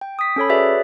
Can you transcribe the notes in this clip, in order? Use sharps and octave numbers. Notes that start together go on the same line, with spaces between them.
G5
D#6 B6
C#4 A4 C#5 B5
F#4 G#4 B4 C#5 D5 E5